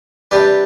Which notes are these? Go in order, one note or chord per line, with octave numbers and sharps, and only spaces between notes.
C3 G3 D4 G4 B4